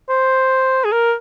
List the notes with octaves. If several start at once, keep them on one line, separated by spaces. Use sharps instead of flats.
C5
G#4
A#4